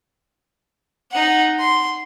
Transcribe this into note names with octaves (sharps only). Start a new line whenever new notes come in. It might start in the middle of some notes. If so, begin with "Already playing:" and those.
D#4 F#5
C6